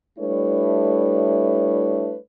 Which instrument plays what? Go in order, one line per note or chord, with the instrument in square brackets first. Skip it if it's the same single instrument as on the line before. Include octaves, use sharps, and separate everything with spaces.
[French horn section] G3 A3 D4 E4 B4 C#5